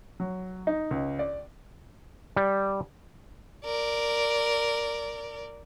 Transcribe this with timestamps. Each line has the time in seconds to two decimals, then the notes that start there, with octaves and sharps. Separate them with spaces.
0.20 F#3
0.67 D#4
0.91 C#2
1.19 D5
2.36 G3
3.64 A#4 D5